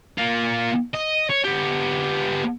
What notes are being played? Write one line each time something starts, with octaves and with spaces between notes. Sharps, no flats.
A#3 F4
D#5
C#5
B3 G4